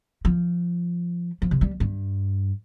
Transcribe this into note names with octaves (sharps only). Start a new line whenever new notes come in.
F3
F3
C3
G3
G2